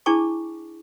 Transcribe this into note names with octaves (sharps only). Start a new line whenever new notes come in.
D4 E4 G#4 A5 C#6 D6